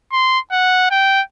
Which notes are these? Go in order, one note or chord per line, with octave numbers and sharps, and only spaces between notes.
C6
F#5
G5